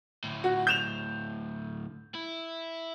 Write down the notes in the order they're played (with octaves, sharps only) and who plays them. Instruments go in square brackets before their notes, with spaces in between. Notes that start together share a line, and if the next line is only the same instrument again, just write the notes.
[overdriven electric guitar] D2 A2
[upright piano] F#4
G6 E7 F7
[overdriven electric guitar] E4